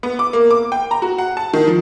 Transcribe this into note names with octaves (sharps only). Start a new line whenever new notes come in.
B3
D6
A#3
D6
G5
A#5
F#4
F#5
A5
D#3
F3